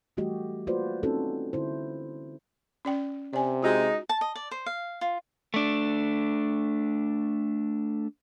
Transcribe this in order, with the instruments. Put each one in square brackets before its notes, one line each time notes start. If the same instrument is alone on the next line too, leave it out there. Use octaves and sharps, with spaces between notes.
[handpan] E3 G3 A3 F#4 G4 D#5
A#3 F4 F#4 B4 C5 D5
C4 C#4 D#4 F4 F#4 A4
D3 E4 C5
[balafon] C#4 D5 G5
[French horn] C3 [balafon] D5 G#5
[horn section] G#3 D#4 [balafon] F4 F#4
[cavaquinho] A5
D#5
D5
C5
F5
F4
[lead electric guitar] A3 D4